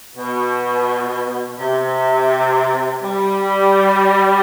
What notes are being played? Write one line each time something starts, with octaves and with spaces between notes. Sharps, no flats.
B2
C3
G3